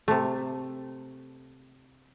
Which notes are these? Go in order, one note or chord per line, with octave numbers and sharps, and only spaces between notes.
C3 A3